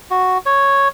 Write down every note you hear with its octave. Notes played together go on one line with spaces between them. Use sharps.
F#4
C#5